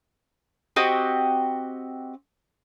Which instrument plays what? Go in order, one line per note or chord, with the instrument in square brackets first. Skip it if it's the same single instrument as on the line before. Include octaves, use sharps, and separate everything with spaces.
[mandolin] C4 F#4 G4 D#5